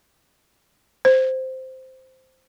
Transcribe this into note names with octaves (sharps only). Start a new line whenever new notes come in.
C5